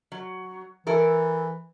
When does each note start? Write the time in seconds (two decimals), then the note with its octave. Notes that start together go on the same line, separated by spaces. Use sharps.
0.12 F#3
0.87 E3 E4 A4 A#4